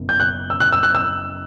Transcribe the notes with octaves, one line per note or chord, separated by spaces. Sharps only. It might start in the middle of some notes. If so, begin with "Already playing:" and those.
Already playing: F#1 B2
G6
F#6
E6
F#6
E6
F#6
E6